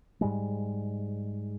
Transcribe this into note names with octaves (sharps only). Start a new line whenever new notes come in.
G#2 G3 G#3